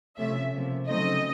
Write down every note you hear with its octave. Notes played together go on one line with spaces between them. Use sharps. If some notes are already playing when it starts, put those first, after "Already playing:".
C3 F3 A3 C#4 E5
C3 F3 A#3
C#3 F#3 A3 C4 D#4 D#5